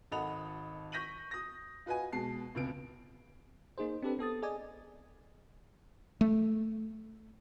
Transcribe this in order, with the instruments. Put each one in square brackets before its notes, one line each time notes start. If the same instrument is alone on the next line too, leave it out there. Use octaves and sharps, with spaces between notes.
[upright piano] G#1 A4 D#5 F#5 B5 F7
C#6 G6 A#6 B6 D#7 F#7
D#6 A#6
F4 F#4 B4 D#5 G#5
B2 G#3 A5 C7
F1 C#2 B3 D7
[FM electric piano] A#3 D#4 G#4 C5
C4 D4 G4 A4 B4
B3 A4 D#6 A6
G#4 D5 D#5 G#5
[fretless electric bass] A3